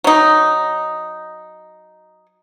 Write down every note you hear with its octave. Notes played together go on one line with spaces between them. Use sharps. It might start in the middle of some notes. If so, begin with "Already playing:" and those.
F#3 D#4